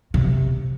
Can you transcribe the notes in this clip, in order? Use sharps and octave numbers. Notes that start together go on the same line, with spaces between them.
C3